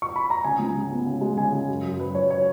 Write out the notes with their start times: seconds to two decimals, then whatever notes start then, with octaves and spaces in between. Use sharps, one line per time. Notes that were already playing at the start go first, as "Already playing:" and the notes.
0.02 C#6
0.16 B5
0.30 A#5
0.44 C#3 G#5
0.59 C#2
0.75 C#3
0.91 B3
1.06 C#3
1.21 G#3
1.37 C#3 G#5
1.52 C#3
1.69 F#2
1.84 F#2
1.99 F#2 B4
2.14 F#3 C#5
2.30 C#5